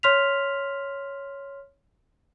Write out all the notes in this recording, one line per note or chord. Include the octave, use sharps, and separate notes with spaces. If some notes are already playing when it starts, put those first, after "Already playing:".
C#5 C6 F6 B6 F7